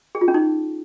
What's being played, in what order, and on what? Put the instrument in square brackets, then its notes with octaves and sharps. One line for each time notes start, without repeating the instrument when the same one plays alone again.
[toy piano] G#4
F4
C#4
D#4